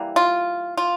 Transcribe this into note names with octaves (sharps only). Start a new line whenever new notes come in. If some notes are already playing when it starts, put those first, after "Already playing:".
Already playing: E3 G3 A#3
F4
F4